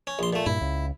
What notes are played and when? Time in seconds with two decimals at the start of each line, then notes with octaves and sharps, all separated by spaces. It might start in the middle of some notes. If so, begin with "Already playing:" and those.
0.07 C#4
0.19 A#1 C6
0.33 A#2 A3
0.46 G2 A#2 E4
0.61 C#2